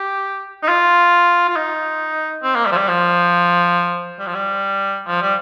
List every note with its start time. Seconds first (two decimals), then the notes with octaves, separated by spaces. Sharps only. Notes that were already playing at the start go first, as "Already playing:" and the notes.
Already playing: G4
0.63 D#4
0.68 F4
1.49 F4
1.56 D#4
2.43 C4
2.55 A#3
2.66 G3
2.72 F3
2.77 G3
2.88 F3
4.19 G3
4.27 F3
4.34 G3
5.07 F3
5.22 G3